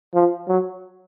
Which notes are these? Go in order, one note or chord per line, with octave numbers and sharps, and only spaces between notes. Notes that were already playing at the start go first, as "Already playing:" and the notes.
F3
F#3